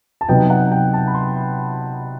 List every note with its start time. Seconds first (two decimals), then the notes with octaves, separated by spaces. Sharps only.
0.21 A5
0.29 C3 F#3 B3 D#4 G5
0.50 F#5
0.72 G5
0.94 A5
1.08 B5
1.15 C6